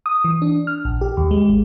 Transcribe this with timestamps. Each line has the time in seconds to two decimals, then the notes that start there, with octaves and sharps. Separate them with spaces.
0.06 D#6
0.24 E3
0.42 D4
0.67 F6
0.85 A#1
1.01 G4
1.17 D#2
1.31 G#3
1.49 G#1